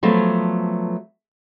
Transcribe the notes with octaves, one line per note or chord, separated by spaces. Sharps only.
F3 F#3 A3 B3